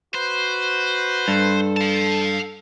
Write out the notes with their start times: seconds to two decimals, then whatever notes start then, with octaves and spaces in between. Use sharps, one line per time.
0.15 F#4 B4 C5
1.28 G2 A4
1.77 F5 A5